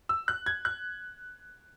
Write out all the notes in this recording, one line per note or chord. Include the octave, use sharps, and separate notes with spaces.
E6
F#6
G#6
F#6